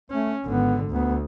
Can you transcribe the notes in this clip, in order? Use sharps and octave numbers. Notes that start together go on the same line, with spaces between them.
A3 C#4
G#1 D3 B3
D2 B3